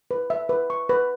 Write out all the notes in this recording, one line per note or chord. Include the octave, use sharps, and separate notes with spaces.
B4
E5
B4
C#6
B4